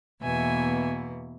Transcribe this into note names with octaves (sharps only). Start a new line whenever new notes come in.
E2 B2 A#3 E5 G#5